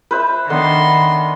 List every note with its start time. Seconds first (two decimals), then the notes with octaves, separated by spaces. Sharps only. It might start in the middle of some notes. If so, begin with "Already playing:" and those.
0.11 B4 C5 E5
0.50 D#3 B3 D4 A4 C6